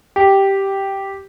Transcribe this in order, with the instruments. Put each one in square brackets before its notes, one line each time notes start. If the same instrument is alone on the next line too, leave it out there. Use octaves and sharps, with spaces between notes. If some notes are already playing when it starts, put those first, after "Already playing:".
[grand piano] G4